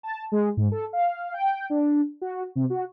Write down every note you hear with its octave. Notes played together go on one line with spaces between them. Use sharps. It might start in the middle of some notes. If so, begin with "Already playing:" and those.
A5
G#3
G#2
A4
F5
G5
D4
F#4
C3
F#4